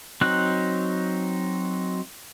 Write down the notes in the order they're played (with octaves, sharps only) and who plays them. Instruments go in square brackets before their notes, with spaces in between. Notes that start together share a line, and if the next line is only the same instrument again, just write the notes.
[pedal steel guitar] F#3 C4 D#4 F#6